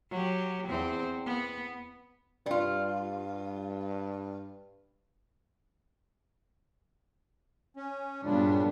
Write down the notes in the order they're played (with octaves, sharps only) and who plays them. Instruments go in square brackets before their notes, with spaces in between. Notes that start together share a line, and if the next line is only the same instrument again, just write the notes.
[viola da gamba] F#3 G4
E2 C4
B3
[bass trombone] G2 [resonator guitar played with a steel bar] G3 F4
[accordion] C#4
[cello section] G2 F#3 B3 [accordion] A#2 C#3 G3 [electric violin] D4